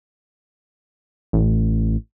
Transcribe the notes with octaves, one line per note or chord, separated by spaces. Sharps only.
A1